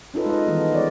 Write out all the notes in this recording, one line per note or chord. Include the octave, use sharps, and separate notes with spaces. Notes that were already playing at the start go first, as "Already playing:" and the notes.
C#4 D#4 F4 A4 B4
G#3 D#5
D#3 E3 G3 G#3 B3
G#3 G#4 C#5 D5